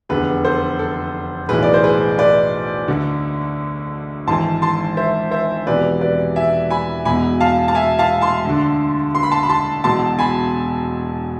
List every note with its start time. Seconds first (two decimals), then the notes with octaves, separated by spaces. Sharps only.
0.09 F1 E2 D3 G#4 B4
0.44 A4 C5
0.79 A4
1.49 B1 A2 E3 G#4 B4
1.63 D5
1.74 C5
1.84 G#4 B4
2.18 B4 D5
2.88 D2 D3
4.27 G#1 G#2 E3 A5 C6
4.62 A5 C6
4.97 C5 E5
5.31 C5 E5
5.66 E1 E2 C3 E3 B4 D5
6.01 B4 D5
6.36 E5 G#5
6.70 G#5 B5
7.05 E1 E2 B2 G#5 B5
7.40 F5 A5
7.68 A5
7.75 E5 G#5
7.99 F5 A5
8.21 A5 C6
8.45 D2 D3
9.15 C6
9.23 B5
9.32 A5 C6
9.43 B5
9.49 A5 C6
9.84 E1 E2 B2 A5 C6
10.19 G#5 B5